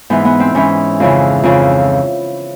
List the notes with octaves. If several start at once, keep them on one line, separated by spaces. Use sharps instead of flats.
G#2 E3 B3
B3
C4
G#2 E3 C#4
F2 C#3 E3
F2 C#3 E3